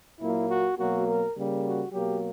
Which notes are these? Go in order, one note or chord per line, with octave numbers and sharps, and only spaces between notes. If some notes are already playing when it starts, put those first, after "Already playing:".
A#2 F#3 A#3 E4
F#4
B2 F#3 A#3 F#4
A#4
C#3 G3 A#3
F#4
B2 F#3 A#3 G4